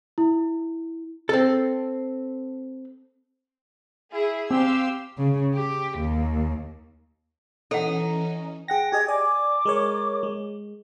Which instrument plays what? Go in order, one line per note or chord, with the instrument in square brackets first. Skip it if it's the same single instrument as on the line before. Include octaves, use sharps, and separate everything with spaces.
[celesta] E4
[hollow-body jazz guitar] C4 A4
[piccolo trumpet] E4 [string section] G#4
[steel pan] C4 [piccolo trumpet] G4 [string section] F5 C6 E6
[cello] C#3
G4
D#2
[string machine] E3 C#4 [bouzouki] D#4 [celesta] A4 F#5
[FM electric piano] G#4 F#5 A#6 [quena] G5
[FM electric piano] G4 G#4 D#5 [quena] G#6
[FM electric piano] D5 G#5 [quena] D6
[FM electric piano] G#3 A#4 C#5
G#3